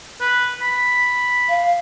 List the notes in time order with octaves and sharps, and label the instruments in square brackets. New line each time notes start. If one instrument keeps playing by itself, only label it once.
[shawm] B4
B5
[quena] F5